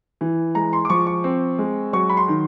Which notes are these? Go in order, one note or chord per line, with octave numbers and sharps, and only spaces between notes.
E3
G#3 A#5
C6
D6
F3 C#6
C#6
C4
G#3
F#3 C#6
B5
C6
D#3